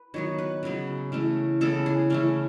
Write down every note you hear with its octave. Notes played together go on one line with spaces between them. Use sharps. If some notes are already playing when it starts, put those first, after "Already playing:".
Already playing: B4
D#3 F#3 B3 C#5
B4
C#3 F#3 B3
C#3 E3 A3
C#3 E3 B3 A4
G#4
C#3 E3 A3 C#4